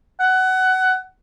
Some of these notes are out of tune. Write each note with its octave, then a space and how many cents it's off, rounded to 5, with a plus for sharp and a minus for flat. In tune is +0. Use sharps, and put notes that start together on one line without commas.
F#5 +20